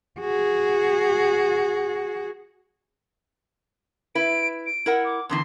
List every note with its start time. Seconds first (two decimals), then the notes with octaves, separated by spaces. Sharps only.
0.20 F#4 G#4
4.15 E4 B4 D7
4.66 D7
4.86 E4 A#4 F#5
5.05 D6
5.29 E2 D3 E3 C6